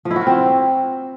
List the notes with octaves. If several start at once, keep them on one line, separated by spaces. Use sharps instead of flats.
F3
E4
F#4
F4
C4